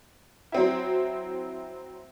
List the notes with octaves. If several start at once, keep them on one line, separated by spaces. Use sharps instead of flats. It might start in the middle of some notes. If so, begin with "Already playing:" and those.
F#3 C4 E4